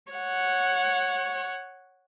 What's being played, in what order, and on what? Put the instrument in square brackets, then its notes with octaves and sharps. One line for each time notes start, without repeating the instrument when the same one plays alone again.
[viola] C#5 F#5